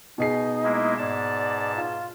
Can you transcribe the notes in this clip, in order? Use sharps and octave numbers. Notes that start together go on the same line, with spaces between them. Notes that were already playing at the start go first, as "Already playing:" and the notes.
B2 D#4 G#4 C7
G#3 A#3 E4
G#2 D5 A5
F4